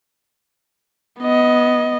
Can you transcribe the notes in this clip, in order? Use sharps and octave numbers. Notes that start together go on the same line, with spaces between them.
B3 D#5